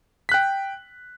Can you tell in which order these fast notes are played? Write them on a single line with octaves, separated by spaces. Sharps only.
B6 F#6 G5